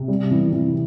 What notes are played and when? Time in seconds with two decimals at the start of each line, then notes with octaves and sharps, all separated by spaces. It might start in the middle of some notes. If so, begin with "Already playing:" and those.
Already playing: C3
0.08 G3
0.31 E3
0.52 E3